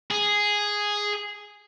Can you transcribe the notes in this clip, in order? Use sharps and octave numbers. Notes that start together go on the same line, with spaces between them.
G#4